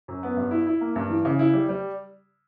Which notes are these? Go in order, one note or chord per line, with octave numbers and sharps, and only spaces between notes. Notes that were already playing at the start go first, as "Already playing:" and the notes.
F#2
B3
G2
E4
E4
A#3
G2
E3
C#3
E4
G3
G3